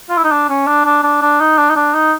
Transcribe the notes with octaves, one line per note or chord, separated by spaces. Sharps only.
F4
E4
D#4
D4
C#4
D4
D4
D4
D4
D#4
D4
D#4
D4
D#4